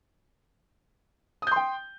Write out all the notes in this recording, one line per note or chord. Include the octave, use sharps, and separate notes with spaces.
G5 C6 D#6 G6